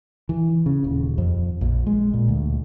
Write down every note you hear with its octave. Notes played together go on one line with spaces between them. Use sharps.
E3
C#3
D#1
F2
A#1
G#3
A#2
D2